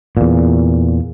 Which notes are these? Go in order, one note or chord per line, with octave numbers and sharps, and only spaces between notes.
E2 A#2